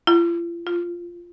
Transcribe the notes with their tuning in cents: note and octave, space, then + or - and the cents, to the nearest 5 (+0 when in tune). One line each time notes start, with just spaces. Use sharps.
F4 -45
F4 -5